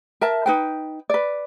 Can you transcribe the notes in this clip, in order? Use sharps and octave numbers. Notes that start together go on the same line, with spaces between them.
A#4 E5 A5
D#4 B4 G5
B4 D5